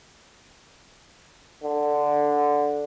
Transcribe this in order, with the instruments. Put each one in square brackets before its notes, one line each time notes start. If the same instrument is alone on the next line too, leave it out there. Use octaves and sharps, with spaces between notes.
[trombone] D3